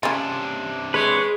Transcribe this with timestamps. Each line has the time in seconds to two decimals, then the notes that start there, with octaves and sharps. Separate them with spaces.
0.03 C3 C#4 D4 F4
0.94 G#3 B4 C#5